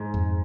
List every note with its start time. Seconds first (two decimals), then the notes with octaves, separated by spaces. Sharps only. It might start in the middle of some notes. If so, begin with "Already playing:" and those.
Already playing: G#2
0.14 F2